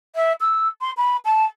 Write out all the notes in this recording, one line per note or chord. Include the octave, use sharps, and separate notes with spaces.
E5
E6
C6
B5
A5